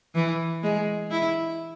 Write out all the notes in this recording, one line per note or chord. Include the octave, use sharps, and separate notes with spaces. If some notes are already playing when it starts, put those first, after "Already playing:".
E3
G#3
E4